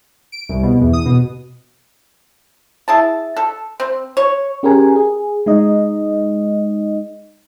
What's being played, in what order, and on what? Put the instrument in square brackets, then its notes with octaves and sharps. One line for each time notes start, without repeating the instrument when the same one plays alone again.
[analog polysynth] D7
C2
B2
E2
D#6
B2
[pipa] E4 G#4 A5
A4
C4
C#5
[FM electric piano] C#4 G4 G#4 A#4 G#5
G#4
G#3 D#4 D#5